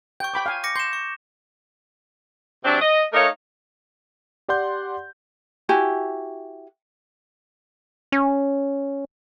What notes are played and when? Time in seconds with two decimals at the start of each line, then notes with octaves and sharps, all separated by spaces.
0.20 G5 C#6 G6
0.34 G5 B5 D6
0.46 F5 G5 G#5
0.64 D6 A#6 C#7
0.76 C6 G6 E7
0.93 C#6
2.65 C3 F#3 C4 D4
2.81 D#5
3.13 A3 D#4 A#4 C#5 D#5 F5
4.48 G4 D5 F#5 C6 G6
5.69 E4 F#4 G4 G#5
8.12 C#4